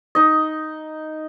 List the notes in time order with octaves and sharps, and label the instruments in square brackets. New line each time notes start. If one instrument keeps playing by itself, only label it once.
[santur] D#4 D#5